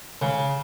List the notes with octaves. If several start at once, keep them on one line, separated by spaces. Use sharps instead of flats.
C#3